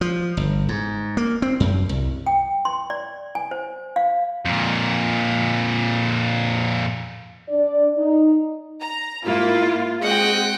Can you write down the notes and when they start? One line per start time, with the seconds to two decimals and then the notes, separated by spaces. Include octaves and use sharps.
0.01 F3
0.37 G1
0.69 G#2
1.17 A#3
1.42 C4
1.60 F#2
1.89 C2
2.26 G5
2.65 C6
2.90 D5
3.35 G#5
3.51 C5
3.96 F5
4.46 F2 A#2
7.48 D4 D5
7.97 D#4
8.80 A#5
9.24 G#2 A#3 E4 F4
10.02 G#3 C4 F#4 D#5 F#5 G5